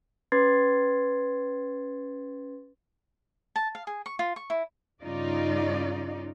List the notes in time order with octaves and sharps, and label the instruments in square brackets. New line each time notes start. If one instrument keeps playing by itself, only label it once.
[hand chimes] C#4 B4 C6 G#6 A6 C7
[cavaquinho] A5
F5
G#4
C#6
F4
C#6
E4
[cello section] G2 C#3 D#4 F4 D5 D#5